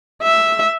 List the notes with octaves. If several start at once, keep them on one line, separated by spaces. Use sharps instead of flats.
E5